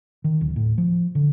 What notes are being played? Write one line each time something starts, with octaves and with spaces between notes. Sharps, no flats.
D#3
D1
A2
F3
D3